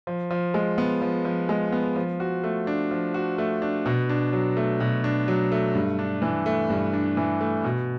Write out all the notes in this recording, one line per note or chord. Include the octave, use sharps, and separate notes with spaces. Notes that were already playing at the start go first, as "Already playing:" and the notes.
F3
F3
G#3
B3
F3
F3
G#3
B3
F3
F#4
A3
D4
F3
F#4
A3
D4
B2
D4
F#3
A3
B2
D4
F#3
A3
G2
D4
E3
A3
G2
D4
E3
A3
B2